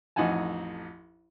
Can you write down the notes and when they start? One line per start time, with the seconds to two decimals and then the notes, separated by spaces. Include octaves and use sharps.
0.16 A1 F2 D#4 F#5 G#5 A5